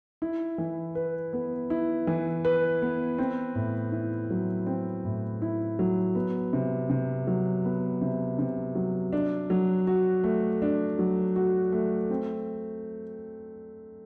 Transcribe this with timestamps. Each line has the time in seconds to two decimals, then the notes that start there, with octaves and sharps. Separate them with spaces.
0.22 E4
0.58 E3
0.95 B4
1.33 B3
1.70 E4
2.07 E3
2.45 B4
2.82 B3
3.18 C4
3.55 A2
3.92 E4
4.31 F#3
4.67 C4
5.05 A2
5.42 E4
5.79 F#3
6.15 B3
6.53 C3
6.90 C3
7.27 F#3
7.65 B3
8.02 C3
8.39 C3
8.75 F#3
9.13 D4
9.50 F#3
9.87 F#4
10.24 A3
10.62 D4
10.99 F#3
11.36 F#4
11.72 A3
12.10 C4